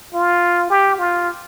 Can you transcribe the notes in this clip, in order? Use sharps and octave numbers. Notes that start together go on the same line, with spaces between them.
F4
G4
F4